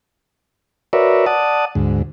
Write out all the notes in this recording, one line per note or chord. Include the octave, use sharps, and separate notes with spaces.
F#4 A#4 B4 C#5 D5 E5
D5 F#5 A5 D#6
D2 G#2